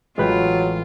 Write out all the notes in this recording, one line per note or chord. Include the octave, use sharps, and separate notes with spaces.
A1 F#3 G#3 F4 B4 G5